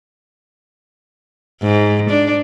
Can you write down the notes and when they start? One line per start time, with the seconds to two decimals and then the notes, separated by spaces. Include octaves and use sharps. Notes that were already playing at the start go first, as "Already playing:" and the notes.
1.62 G#2
2.10 D4